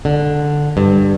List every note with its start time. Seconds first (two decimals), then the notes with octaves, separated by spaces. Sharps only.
0.05 D3
0.77 G2